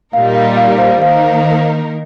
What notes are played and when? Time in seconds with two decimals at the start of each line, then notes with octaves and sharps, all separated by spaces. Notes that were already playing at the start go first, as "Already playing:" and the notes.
0.13 A#2 G3 D#4 A#4 F5
0.35 F5
0.57 F5
0.78 C5 F5
1.02 D#3 A#3 D#4 A#4 C5 F5